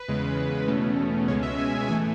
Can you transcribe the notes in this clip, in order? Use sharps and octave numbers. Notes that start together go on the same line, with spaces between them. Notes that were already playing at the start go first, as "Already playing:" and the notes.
Already playing: B4
E2 C#3 G#3
E2 B2 A3 C#4
C#2 B2 G#3 C#4 C#5
E5
G#5
A2 E3 A3 G#5